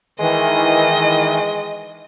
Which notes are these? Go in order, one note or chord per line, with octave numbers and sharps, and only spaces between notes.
D#3 E3 G#3 D#5